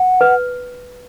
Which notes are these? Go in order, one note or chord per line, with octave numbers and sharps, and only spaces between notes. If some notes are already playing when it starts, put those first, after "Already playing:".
Already playing: F#5
B4